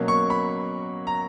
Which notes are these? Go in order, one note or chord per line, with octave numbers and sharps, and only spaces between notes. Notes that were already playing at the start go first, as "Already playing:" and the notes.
Already playing: B2 F#3 A#3 C#4
C#6
B5
A#5